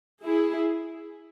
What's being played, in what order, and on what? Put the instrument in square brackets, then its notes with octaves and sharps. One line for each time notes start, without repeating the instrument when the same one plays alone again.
[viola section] E4 G#4